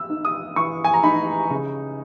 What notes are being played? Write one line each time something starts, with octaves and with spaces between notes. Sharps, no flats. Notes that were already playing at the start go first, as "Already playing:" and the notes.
Already playing: E6
D#4
D#6
E3 C#6
G#5
A#5
D#4 B5
C#3